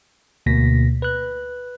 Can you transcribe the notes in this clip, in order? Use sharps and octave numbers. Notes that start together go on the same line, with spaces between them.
D2 B2 A#3 A#6 B6
B4 F#6